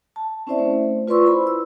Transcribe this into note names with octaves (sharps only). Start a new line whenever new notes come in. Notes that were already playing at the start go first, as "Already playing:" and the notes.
A5
C4 C#4 E4 C5 D5 E5
A3 C5
F4 B4 D5 C6 C#6 E6
E4 C5 B5
E6